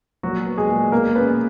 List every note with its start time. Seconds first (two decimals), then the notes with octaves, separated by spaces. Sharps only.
0.23 A#2 F#3 F#4
0.46 B3
0.57 G#3 G#4
0.69 A#2
0.92 B2 A#3 A#4
1.15 B3 C#4 B4